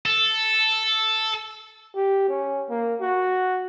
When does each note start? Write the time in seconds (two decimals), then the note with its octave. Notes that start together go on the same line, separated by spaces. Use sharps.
0.05 A4
1.95 G4
2.29 C#4
2.70 A#3
3.01 F#4